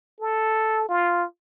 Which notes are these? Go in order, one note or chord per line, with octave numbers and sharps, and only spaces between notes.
A4
F4